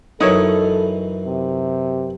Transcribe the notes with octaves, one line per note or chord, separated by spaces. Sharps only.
F#2 E3 D#4 E4 A4 C#5 D#5
C3